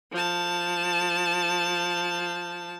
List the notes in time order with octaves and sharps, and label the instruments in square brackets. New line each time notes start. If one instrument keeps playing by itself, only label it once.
[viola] F3 A5